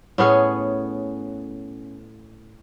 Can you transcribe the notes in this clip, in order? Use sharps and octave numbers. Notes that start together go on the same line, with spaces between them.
A2 B3 C#4 G#4